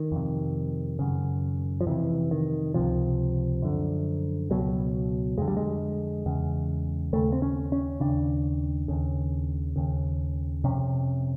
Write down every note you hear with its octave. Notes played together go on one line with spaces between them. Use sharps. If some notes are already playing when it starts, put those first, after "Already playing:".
Already playing: D#3
F2 C3
F#2 C#3
F3
F2 C3 E3
D#3
C#2 C3 F3
F#2 D3
C#2 B2 F#3
F2 D3 G#3
G3
G#3
E2 C#3
D#2 C#3 A3
C4
C#4
C#4
D#2 C#3 D4
D#2 C#3
D#2 C#3
F2 C3 C#4